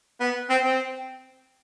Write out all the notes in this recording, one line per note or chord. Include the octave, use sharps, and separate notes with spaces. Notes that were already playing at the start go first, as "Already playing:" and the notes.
B3
C4
C4